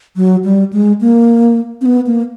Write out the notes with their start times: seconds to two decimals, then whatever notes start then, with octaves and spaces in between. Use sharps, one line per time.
0.16 F#3
0.44 G3
0.73 G#3
1.01 A#3
1.81 C4
1.85 B3
2.06 A#3